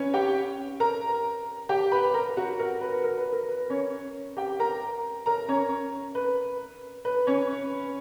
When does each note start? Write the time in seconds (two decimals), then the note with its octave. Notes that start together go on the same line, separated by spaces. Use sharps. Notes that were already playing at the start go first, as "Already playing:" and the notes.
Already playing: C#4 B4 C#5
0.14 G4 G5
0.80 A#4 A#5
1.69 G4 G5
1.92 B4 B5
2.14 A#4 A#5
2.37 F#4 F#5
2.60 A#4
2.81 B4
3.04 A#4
3.18 B4
3.33 A#4
3.49 B4
3.70 C#4 C#5
4.37 G4 G5
4.60 A#4 A#5
5.26 A#4 A#5
5.48 C#4 C#5
6.15 B4
7.05 B4
7.27 C#4 C#5